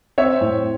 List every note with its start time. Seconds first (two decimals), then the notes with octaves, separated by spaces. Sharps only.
0.18 C4 C#5 E5
0.41 A2